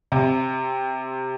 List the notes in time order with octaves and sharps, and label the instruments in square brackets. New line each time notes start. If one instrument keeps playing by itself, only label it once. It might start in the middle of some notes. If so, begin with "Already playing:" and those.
[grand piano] C3